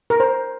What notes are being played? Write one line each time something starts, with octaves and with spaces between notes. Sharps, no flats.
A#4
C5